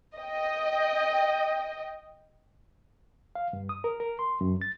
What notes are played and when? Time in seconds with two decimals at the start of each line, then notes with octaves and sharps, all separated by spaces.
0.16 D#5 G5
3.35 F5
3.53 G2
3.69 D#6
3.84 A#4
4.00 A#4
4.19 C6
4.41 F#2
4.61 A6